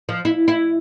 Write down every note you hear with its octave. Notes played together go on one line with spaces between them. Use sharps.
F3
E4
E4